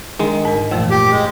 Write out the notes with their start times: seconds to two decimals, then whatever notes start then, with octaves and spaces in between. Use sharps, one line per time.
0.19 D#3 G#3 D4
0.45 G#2 A#4
0.71 F#2 A#2 E3 F3 A3
0.90 G4
1.12 G#3